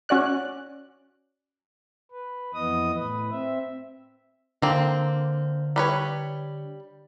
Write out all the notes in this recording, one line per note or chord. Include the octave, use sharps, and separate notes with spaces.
C#4 F#4 D5 F#6
B4
F2 E3 B3 D#5 D#6
A2 B4
C4 E5
D3 A#3 C4
G3 B4 C#5